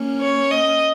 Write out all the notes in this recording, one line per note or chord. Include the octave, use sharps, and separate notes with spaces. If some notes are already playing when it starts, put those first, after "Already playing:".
Already playing: A#3 C#4
C#5
D#5